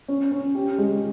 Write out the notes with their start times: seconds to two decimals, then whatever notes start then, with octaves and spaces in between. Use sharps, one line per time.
0.08 C#4
0.31 C#4
0.55 G4
0.78 G#3